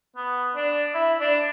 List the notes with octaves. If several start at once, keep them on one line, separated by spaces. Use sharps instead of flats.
B3
D4
E4
D4